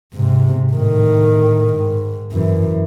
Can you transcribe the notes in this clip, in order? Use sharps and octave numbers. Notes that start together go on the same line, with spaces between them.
G#2 C3
A2 D#3
G#2
F#2 E3